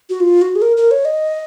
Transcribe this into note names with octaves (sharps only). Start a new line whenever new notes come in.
F#4
F4
F#4
G#4
A#4
A#4
C#5
D#5